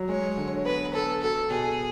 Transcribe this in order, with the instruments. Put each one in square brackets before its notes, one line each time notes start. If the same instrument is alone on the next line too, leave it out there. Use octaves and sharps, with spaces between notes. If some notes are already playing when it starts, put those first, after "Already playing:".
Already playing: [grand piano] F#3
[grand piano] G#3 [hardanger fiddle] C#5
[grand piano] D3
[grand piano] B3 [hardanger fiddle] B4
[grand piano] B3 [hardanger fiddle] A4
[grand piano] F#4 [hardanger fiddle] A4
[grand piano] B2 [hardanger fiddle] G#4